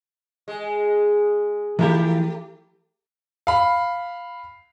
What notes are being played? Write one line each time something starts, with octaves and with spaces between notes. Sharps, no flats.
G#3
E3 F3 A3 E4 G4
F5 B5